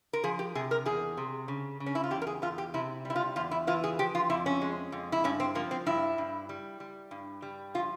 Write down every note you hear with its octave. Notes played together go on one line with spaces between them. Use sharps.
A#4
F3 G#4
G4
C3 G#4
A#4
E2 G#4
C3
C#3
C#3
C#4
E4
F4
E2 G4
A#4
G#4
E2 F4
G4
C3 E4
G3 E4
F4
E2 F4
E4
E3 F4
G#4
F3 G4
F4
F2 E4
C#4
G#3
F2
E4
G2 C#4
C4
F3 A#3
C4
G2 E4
G2
G3
G3
G2
G3
F3 F4